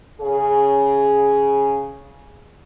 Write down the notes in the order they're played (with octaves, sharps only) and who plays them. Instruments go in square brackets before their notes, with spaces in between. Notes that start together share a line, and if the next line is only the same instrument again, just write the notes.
[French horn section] C#3 G#4